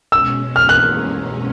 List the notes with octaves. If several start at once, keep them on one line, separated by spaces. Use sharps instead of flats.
B2 G#3 C#4 E6
F6
F#6